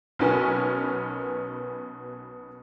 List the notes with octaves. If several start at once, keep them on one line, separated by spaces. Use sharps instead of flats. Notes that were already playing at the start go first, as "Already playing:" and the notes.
B1 B2 B3 C#4 A#4 G#5